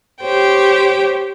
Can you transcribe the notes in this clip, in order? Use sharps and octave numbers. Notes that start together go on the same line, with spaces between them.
G4 C5 C#5 G5